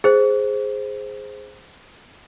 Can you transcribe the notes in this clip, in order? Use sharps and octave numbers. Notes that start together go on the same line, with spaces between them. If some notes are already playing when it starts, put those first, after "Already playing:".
G#4 C5